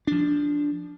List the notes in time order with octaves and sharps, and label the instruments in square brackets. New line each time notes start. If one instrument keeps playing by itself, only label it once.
[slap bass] F3 D4